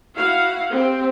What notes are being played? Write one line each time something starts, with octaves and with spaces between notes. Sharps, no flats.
E4 F#4 F5 F#5
C4 G4